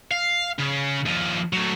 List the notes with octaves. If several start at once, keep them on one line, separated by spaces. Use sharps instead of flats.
F5
C#3
D#2 F3
F#3 A3